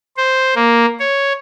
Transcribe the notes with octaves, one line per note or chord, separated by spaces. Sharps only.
C5
A#3
C#5